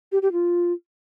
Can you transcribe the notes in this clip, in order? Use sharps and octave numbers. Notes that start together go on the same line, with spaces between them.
G4
G4
F4